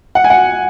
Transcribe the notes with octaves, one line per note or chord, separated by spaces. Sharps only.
F#5
G#5
F#5